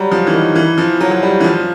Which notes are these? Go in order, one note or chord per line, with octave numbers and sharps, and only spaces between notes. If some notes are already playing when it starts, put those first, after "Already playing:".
Already playing: F#3 G3
F3
E3
D#3
E3
F3
F#3
F#3
G3
E3
F3